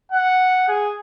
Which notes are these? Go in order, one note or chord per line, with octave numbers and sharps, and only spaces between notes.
F#5
G#4